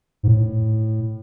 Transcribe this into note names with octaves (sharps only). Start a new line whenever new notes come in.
G#2
A2